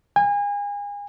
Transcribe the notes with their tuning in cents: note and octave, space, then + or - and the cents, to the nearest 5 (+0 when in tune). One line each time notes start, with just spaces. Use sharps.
G#5 -35